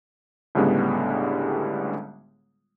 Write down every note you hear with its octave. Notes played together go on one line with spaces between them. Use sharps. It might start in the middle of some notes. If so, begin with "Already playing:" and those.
C#2 A2 D3 G3 G#3 B3